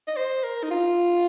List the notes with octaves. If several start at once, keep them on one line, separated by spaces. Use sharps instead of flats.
D#5
C5
A#4
D#4
F4